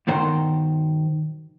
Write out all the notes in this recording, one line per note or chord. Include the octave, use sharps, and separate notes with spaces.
G2 B2 D#3 C5 A#5